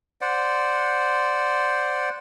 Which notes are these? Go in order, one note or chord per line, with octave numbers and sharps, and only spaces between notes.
C5 D5 F#5